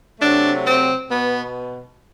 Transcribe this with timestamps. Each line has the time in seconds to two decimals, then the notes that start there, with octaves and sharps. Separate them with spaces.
0.20 C3 F#3 A3 D4
0.64 C4
1.09 B2 B3